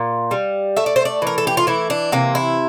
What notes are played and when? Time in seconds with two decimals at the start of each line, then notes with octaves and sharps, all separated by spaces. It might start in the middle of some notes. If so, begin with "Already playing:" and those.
Already playing: A#2 F5
0.31 G3
0.77 A3 E5
0.86 D5
0.96 C5
1.05 D5
1.22 E3 A#4
1.38 A4
1.47 G4
1.57 F4
1.67 E3 E4
1.90 D4
2.12 C3 A#3
2.35 E4